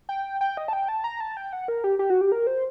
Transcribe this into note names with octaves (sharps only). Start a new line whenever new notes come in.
G5
G5
D#5
A5
G5
A5
A#5
A5
G5
F#5
A#4
G4
G4
F#4
G4
A#4
C5